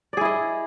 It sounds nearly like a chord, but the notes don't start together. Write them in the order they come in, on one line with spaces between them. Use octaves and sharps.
D5 G#4 E4 D#5